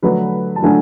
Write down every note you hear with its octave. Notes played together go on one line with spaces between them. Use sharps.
D3 F#3 A3 D4 B4
A5
D3 F#3 A3 D4 G#5